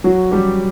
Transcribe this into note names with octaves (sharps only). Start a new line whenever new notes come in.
F#3 F#4
G3 G4